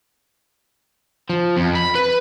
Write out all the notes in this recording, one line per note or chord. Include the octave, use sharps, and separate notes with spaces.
F3
F2
B5
B4